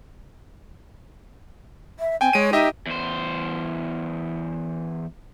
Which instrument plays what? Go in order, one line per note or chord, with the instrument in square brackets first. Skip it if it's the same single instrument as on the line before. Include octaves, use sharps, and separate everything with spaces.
[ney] E5
[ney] C4 [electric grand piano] G5 G#5
[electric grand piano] G#3 D7 D#7 [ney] C#5
[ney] D#4 [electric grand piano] G4 D#5 E5
[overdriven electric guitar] E2 C5